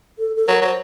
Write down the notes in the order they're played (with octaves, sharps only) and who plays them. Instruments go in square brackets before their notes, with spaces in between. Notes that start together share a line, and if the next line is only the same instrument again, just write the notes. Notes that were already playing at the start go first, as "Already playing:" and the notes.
[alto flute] A4
A4
[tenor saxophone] F#3 [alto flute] A#4
[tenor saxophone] F#3 [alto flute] C5